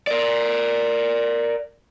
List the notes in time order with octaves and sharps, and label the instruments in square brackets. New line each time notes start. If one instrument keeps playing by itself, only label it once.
[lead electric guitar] A#4 D5